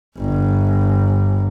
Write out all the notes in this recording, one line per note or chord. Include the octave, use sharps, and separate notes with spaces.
G1